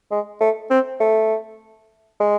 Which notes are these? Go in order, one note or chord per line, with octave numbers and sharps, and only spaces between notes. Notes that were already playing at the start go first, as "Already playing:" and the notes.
G#3
A3
C4
A3
G#3